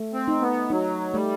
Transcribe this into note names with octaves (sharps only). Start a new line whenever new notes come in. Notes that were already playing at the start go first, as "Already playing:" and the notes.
Already playing: A3
C4
D#4
B3
F#3 D#4
G3 A3